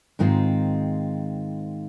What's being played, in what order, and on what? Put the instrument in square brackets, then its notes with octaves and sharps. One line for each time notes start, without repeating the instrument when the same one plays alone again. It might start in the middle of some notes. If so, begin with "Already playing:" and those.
[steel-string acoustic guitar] G#2 D#3 G#3 C4 F4